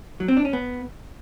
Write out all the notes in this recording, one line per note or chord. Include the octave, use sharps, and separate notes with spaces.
F#3
C4
D4
C#4
B3